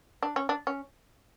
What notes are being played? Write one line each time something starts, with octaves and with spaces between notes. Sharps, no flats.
D4
C#4
D4
C#4